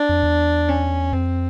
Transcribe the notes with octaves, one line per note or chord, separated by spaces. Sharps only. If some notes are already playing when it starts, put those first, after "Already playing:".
Already playing: D4
F2
E2
C#4
F2 C4